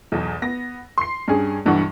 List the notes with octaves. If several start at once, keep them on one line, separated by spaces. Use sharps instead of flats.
B1 E2
B3 A#6
C6 C7
G2 C#4 G#4
B1 G2 E3 F#5 C#6